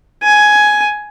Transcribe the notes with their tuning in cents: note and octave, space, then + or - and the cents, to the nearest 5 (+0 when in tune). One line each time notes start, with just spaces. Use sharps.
G#5 +10